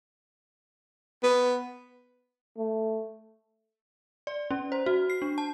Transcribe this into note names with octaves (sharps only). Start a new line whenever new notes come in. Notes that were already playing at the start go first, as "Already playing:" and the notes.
B3
A3
D5
C#4
C5
F#4
C7
D4
A5